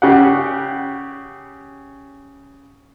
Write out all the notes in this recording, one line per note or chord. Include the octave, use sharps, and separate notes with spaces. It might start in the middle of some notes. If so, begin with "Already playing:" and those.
C#3 G4 F#5